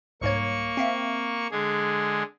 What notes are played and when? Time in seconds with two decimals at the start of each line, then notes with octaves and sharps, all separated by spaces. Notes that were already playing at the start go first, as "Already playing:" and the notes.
0.21 C2 G#2 A#3 C#5 C#6
0.77 C4 E5 F5
1.51 D3 G#3 G#4